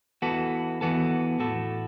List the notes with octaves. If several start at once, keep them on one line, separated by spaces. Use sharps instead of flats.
E2 E3 B3 F#4 A4
E2 E3 B3 F#4 A4
A2 A3 F#4 A4